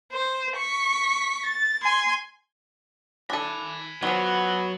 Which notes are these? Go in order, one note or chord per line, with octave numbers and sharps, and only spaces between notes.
C5
C#6 B6
A6
G#5 C6
D4 A4 G#5 B5
D#3 F3 F#3 B3